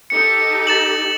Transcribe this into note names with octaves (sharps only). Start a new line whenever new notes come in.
D#4 G4 A4 C#7
A6 E7 F#7